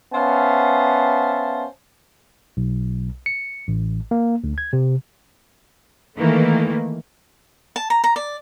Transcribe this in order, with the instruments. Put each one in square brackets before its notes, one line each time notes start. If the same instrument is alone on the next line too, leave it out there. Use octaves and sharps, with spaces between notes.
[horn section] B3 C#4 C5 E5 F5 A5
[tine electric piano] B1
C#7
A1
A#3
D2
G#6
C3
[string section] D#3 E3 A3 A#3
[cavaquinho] A5
A#5
A#5
D5